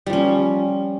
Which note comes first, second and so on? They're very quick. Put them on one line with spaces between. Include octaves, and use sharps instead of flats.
G3 F3 C#4